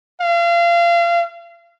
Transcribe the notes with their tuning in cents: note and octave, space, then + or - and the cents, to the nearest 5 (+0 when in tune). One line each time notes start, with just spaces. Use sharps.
F5 -30